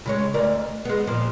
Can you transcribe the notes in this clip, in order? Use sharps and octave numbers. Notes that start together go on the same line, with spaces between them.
C#3 G#3 C#5
D2 A#4 D5
G#3 B3
A#2 F3